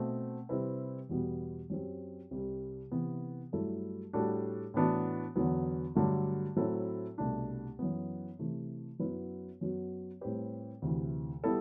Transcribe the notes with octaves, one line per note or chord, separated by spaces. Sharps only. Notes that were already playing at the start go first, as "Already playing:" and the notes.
Already playing: B2 A3 C4
C3 G3 C4 E4 B4
E2 B2 G3 B3 F#4
F#2 F#3 C4 G4
C2 C3 G3
C3 E3 B3
G2 F#3 A3 E4 A4
A2 G3 D4 F#4 A4
A2 E3 B3 D4 F#4
E2 D3 F#3 B3
G2 D3 F#3 A3
A2 F#3 C4 E4 A4
C2 B2 A3 D4
F#2 E3 B3
C3 E3 A3
F#2 F#3 B3 E4 B4
F#2 F#3 B3 F#4
A2 G3 C4 G4 B4
D2 C3 E3
G3 B3 E4 A4